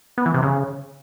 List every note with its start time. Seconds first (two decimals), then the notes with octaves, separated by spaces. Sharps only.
0.18 B3
0.26 E3
0.34 C3
0.42 C#3